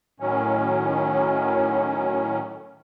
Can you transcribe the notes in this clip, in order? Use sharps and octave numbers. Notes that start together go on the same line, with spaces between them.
A2 D#3 F#3 C#4